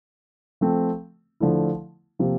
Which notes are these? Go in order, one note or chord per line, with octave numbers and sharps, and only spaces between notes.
F3 A3 C4
D3 F3 A3 E4
C3 F3 A#3